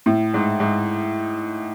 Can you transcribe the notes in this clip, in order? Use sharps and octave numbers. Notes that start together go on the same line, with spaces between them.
A2
G#2
G#2